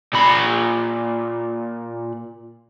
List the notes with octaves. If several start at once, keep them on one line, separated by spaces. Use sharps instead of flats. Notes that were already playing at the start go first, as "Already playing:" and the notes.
A#2 B5